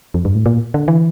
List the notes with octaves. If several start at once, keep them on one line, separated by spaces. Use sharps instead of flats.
F2
G2
A2
A#2
D3
E3